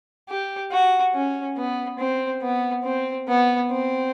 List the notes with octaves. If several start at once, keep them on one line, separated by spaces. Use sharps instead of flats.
G4
F#4
C#4
B3
C4
B3
C4
B3
C4